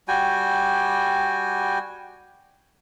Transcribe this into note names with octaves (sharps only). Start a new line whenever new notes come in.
G3 F#4 G5 G#5